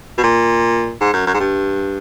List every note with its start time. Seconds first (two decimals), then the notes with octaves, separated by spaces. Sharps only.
0.18 B2
0.23 A#2
1.01 G#2
1.13 F#2
1.27 F#2
1.34 G#2
1.40 G2